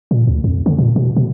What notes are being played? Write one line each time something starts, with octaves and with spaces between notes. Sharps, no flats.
A#2
D2
F2
D3
A#2
B2
B2